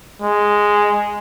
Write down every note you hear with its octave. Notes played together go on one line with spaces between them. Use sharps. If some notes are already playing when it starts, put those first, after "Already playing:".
G#3